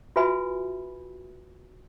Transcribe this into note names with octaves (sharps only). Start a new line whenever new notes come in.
F4 F#4 B4 E5 G#5 B5